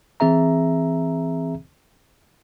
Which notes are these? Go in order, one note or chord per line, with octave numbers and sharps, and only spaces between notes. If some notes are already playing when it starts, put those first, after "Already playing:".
E3 C4 G#4 E5 A#5